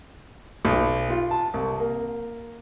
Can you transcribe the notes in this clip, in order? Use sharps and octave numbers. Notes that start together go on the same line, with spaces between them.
B1
F4
A5
C2
A#3